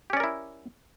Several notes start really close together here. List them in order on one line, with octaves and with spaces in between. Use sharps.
G4 C#4 D5 A#4 E4